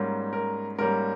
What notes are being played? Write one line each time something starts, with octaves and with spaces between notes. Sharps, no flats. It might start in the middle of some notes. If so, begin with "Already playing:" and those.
Already playing: G#2 G3 A#3 C#4
A#4
G#2 G3 A#3 C#4 A#4